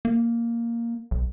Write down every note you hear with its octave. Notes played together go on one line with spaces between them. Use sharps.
A#3
B1